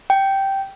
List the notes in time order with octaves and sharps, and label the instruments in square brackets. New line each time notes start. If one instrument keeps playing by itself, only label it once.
[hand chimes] G5